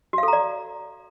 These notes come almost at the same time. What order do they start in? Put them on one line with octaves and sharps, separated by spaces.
F#4 F5 A4 A#5 D5